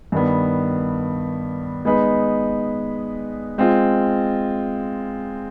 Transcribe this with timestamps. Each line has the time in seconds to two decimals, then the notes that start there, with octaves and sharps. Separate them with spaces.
0.12 G2 D#3 B3
1.85 G#3 B3 D#4 B4
3.58 G#3 C4 F4